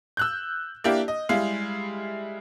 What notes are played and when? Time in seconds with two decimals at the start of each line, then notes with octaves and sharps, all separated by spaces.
0.17 E6 F#6 G6
0.84 A#3 D4 E4 G4
1.08 D#5
1.29 G3 G#3 E4 F5